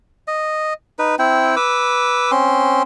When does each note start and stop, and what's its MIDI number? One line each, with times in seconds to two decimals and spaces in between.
0.28 0.73 75
0.99 1.15 63
0.99 1.15 71
1.19 1.55 60
1.19 1.55 64
1.19 1.55 79
1.56 2.31 71
1.56 2.31 86
1.56 2.31 88
2.31 2.82 60
2.31 2.82 61
2.31 2.82 84